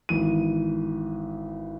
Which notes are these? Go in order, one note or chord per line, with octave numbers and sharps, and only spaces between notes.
G#1 E3 D#7